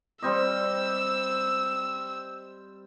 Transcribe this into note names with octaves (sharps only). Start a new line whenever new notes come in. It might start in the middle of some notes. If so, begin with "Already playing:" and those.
G3 C4 D#5 E6